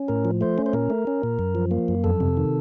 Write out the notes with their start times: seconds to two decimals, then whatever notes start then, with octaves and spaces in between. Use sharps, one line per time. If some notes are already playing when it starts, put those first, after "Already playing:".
Already playing: C#4
0.08 A2 A#4
0.25 F3
0.41 A3 C5
0.58 C#4
0.66 C5
0.73 A#2 A#4
0.90 A3
1.07 C#4
1.23 A#2
1.39 F#2
1.55 F3
1.71 A#3
1.88 F#2
2.04 F2 A4
2.20 C3
2.37 D#3